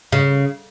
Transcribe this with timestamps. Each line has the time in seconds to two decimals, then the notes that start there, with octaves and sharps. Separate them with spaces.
0.12 C#3